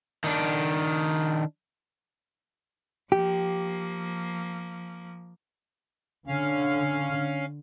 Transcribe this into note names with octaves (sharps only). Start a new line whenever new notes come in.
D#3 D4
F3 A#3 G4
D3 C#4 F5